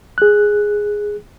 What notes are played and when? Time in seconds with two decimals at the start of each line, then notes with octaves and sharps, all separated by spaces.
0.18 G#4 F#6